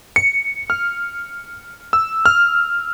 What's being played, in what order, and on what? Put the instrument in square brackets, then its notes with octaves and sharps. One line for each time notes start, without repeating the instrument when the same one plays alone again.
[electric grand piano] C#7
F6
E6
F6